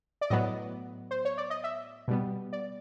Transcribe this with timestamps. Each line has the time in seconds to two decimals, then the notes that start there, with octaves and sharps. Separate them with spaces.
0.21 D5
0.30 A2 F#3 B3 D#5
1.11 C5
1.25 C#5
1.38 D5
1.50 D#5
1.64 E5
2.08 B2 G3 B3
2.53 D5